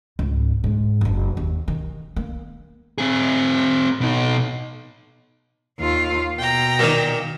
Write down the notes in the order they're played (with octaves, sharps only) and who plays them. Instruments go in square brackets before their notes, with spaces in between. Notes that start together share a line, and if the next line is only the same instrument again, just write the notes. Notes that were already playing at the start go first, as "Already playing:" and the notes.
[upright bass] C#2 G#2
G#2
F#1 D4
D#2
D#3
A#3
[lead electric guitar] C4 G#4
B2 D#4
[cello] D#2 F4
[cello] B2 [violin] G5 A#5
[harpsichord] A#2 D#3